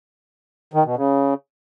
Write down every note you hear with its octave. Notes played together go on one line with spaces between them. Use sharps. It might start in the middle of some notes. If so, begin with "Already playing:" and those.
D#3
B2
C#3